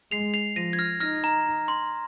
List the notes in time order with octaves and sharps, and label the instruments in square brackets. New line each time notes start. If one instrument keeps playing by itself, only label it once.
[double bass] G#3 [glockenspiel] C7 F7
[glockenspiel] C7 F7
[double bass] F3 [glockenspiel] A#6 D#7
[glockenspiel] G#6
F6 A#6
[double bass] D#4 [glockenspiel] F6 A#6
[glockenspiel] A#5
C6